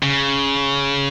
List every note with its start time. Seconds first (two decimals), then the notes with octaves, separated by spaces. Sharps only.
0.03 C#3